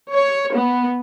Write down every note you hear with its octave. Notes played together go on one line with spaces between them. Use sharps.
C#5
B3